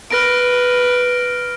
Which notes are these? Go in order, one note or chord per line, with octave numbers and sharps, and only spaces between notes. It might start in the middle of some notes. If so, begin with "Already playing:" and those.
B4 F6 A#6 D7